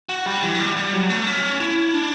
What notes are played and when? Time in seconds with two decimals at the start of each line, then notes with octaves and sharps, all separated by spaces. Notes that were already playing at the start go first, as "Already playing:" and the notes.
0.09 F#4
0.26 G3
0.43 E3
0.55 F#3
0.60 G3
0.77 G3
0.93 F#3
1.10 A3
1.27 C#4
1.61 E4
1.94 D4